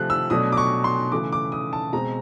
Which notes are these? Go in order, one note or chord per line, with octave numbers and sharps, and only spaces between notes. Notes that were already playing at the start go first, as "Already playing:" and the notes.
Already playing: C3 F3 A3 F#6
E6
B2 F#3 A3 D4 D#6
D6
C#6
C6
C#3 E3 A3 D6
D6
D#6
A5
B2 G#3 C4 A#5